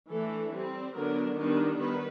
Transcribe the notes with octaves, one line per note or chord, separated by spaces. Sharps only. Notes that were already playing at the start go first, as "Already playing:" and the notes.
E3 A3 D4 A4
G3 C4
D3 F#3 B3 D4 A#4
D#3 G3 B3 D4
D#3 G3 B3 B4